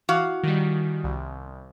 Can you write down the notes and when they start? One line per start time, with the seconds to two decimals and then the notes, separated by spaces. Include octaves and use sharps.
0.09 E3 F#4 F5
0.43 D#3 G3
1.04 C2